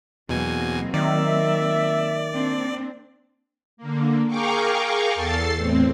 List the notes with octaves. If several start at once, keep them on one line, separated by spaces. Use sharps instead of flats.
E2 B2 F#3 A#3 C4 G#5
D#3 D5 E5
A#3 C4 D4
D3 A#3
G#4 A#4 F5 G5 C#6 D6
E2 A4 A6 C7
E2 A2 C4